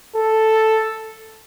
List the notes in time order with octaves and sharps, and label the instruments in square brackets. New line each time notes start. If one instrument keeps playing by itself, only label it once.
[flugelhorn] A4